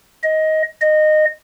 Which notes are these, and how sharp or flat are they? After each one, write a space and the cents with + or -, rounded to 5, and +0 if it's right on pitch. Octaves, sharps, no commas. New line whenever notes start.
D#5 +15
D#5 -15